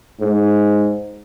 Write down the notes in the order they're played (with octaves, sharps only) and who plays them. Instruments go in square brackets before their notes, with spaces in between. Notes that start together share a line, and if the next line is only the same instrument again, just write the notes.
[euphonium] G#2